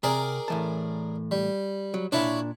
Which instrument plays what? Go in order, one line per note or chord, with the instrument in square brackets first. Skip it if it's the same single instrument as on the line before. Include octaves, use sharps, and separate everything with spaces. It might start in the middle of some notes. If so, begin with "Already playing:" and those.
[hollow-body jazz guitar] C3 [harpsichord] G#4 A#4 D5
[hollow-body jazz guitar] A2 E3 A5
[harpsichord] G3
[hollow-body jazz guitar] F#3
[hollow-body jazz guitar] A#2 D4 [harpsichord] E4 C#5 D5